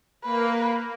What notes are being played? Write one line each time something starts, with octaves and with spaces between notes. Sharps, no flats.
A#3 B4